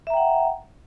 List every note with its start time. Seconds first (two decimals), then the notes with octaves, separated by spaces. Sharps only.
0.07 E5
0.10 A#5
0.14 G5
0.17 F#5